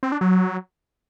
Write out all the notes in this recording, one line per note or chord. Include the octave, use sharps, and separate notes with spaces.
C4
D4
F#3